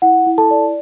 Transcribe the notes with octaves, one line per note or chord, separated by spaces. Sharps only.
E4 F#5
E4
A4 A5
D5